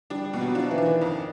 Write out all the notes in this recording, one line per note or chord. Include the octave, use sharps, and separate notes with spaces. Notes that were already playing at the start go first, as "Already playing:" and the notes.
G3 D4
G3
B2
F#3
F3 D4
E3
D4
D#3
F2